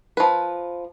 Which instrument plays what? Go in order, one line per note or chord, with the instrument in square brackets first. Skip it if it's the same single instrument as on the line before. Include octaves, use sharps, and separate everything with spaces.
[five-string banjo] F3 B4